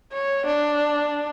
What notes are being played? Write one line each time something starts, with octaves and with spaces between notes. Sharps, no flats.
C#5
D4